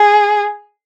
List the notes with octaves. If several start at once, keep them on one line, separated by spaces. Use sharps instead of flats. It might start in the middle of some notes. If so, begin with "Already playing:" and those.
Already playing: G#4